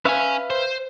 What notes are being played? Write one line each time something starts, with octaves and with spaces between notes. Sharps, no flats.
C#4 B4 E5 F5 G#5
C5